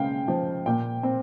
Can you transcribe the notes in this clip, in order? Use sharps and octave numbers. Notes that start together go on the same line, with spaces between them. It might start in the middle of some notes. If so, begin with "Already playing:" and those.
Already playing: C#3 G#3 F5 G5
F3
A#2 G5
C4